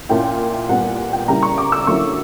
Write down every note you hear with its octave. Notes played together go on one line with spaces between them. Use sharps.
A#2 A#3 C#4 E4 G5
A#2 G3 B3 F#5
G5
C#3 G3 A#3 E4 A#5
C#6
D6
E6
D3 F#3 A#3 C#4 E4 C#6